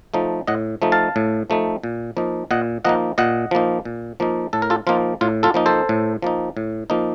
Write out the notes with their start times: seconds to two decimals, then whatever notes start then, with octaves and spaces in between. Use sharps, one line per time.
0.14 F3 A3 D#4
0.47 A2 D#5 F#5
0.82 F3 A3 D#4
0.92 F5 A5
1.16 A2
1.50 F3 A3 D#4
1.84 A#2
2.17 F3 A#3 D#4
2.51 A#2 D#5 F#5
2.85 F3 A#3 D#4 D#5 F#5
3.18 A#2 D#5 F#5
3.51 F3 A#3 D#4
3.85 A#2
4.20 F3 A#3 D#4
4.53 A2 A4
4.62 A#4
4.70 F4 A4
4.87 F3 A#3 D#4 F4
5.21 A2 F4
5.43 F4 A4
5.54 F3 A#3 D#4
5.66 A4 C5
5.89 A2
6.22 F3 A#3 D#4
6.57 A2
6.90 F3 A#3 D#4